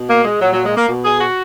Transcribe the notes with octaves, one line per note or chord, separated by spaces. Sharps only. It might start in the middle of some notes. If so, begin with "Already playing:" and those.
Already playing: B2
A#3
G#3
A#2 F#3
F#3
G#3
A#3
B2
G#4
F#4